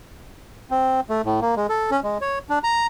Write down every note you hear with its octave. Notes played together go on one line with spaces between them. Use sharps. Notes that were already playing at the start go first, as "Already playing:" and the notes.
C4
A3
A2
A#3
G#3
A4
C#4
G#3
C#5
D4
A#5